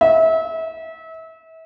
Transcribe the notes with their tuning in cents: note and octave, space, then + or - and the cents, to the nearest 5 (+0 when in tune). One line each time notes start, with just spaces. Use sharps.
E5 -30